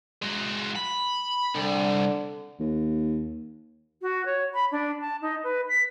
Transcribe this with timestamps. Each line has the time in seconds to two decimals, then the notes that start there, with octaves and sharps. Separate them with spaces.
0.22 G#3 F#4
0.76 B5
1.55 C2 D3
2.60 D#2
4.01 F#4
4.25 C#5
4.54 B5
4.72 D4
5.01 A5
5.21 D#4
5.43 B4
5.68 B6